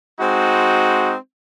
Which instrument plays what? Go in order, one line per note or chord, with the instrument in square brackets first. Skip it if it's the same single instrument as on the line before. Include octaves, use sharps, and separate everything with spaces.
[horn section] G#3 C4 D#4 F#4